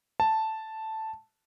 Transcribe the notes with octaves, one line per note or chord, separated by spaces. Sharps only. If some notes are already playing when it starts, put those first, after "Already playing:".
A5